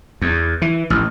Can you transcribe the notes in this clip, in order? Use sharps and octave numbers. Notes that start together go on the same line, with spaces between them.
E2
E3
A1